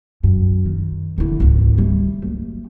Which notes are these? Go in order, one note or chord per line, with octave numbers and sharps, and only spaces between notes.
F#2
D#3
D3 E4
G#1 C#2
G3 A3
F#1